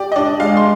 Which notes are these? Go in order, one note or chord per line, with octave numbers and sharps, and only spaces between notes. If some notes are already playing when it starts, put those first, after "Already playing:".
Already playing: G4 D5
D#5
D4 D5
G#3 F5
C6